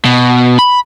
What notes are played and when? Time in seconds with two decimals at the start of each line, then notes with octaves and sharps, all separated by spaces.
0.05 B2
0.59 B5